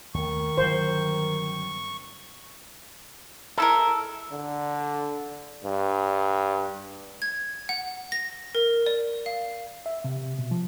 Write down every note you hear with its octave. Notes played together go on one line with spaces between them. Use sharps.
D#2 D#3 A3 C#6
G1 C#3 F#3 C5
G#3 E4 A4 A#4
D3
G2
G#6
F#5
A#6
A#4
D5
F5
E5
C3
B2
F3